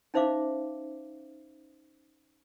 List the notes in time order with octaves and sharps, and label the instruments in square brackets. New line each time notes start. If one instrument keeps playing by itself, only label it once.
[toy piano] C#4 D#4 C5 E5 F5 D6